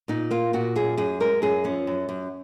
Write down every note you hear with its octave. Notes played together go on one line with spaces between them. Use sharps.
A#2 D#4
A#3 F4
A#2 F#4
F#2 G#4
F#2 G#4
G#3 A#4
F#2 G#4
F3 C#4
F#2
F#2